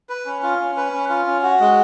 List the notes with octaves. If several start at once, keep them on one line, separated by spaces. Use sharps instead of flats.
B4
C#4
F4
C#4
B4
C#4
F4
C#4
F#4
G#3